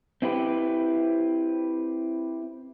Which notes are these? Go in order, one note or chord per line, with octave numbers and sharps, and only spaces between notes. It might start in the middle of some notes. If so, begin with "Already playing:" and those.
C4 E4 G4 B4